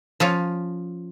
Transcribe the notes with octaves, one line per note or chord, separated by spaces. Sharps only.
F3 C#4 F4